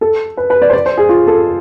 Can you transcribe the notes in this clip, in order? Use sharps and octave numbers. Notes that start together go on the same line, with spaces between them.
A4
B4
B4
D5
C5
D5
C5
G#4
F4
A4